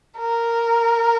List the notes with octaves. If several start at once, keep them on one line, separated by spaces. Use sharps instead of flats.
A#4